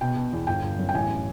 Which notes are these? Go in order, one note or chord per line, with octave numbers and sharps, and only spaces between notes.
B2 G5
B2
E2
G1 G5
G1
F#2
G5
A1 G#5